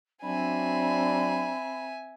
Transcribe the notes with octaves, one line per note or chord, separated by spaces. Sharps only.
F#3 C4 D4 E5 G#5 B5